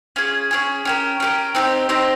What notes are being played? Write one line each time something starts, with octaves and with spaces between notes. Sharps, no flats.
C#4 F4 G#4
C#4 F4 G#4
C#4 G4 A#4
C#4 G4 A#4
C4 D#4 G4 C5
C4 D#4 G4 C5